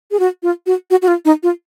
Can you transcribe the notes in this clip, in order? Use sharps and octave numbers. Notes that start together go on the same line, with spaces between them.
G#4
F#4
F4
F#4
F#4
F#4
F4
D#4
F4